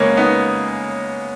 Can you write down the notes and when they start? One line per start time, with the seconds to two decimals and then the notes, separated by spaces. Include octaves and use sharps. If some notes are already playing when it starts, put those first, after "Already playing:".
Already playing: C#3 G#3 A#3 B3 C#4
0.17 B3 D#4